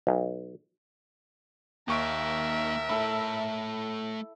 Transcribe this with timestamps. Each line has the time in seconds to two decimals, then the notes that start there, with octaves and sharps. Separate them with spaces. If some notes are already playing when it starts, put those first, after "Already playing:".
0.07 B1
1.88 D#2 A#3 D#4 A#4 E5 C#6 D7
2.89 A3 E4 A4 C#5 B5